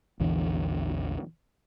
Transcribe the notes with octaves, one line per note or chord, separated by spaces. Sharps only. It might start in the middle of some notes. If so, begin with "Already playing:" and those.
A#1 E2 D3 E3